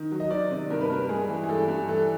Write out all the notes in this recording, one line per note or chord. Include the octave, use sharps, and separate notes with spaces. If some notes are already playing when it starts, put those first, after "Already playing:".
Already playing: D#3
F#3
D#5
D#3 D5
C3
G2 A#4
B4
G2 A#4
G#3 G#4
E3
G#4
G2 A4
G2
E3 A4